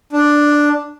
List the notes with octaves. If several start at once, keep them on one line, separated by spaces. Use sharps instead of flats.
D4